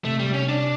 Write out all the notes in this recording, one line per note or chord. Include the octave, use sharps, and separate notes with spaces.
C3 A3
G3
C#4
D4